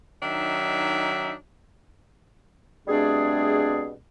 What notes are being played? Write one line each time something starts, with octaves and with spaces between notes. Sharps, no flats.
D#3 F#3 D4 D#4 E5
B2 G3 A3 C4 D4 G#4